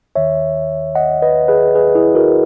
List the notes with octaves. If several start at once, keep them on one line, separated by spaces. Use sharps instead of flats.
D#2 D#3 C#5 E5
D#5 F#5
B4 D#5
G#4 B4
G#4 B4
E4 G#4
F#4 A#4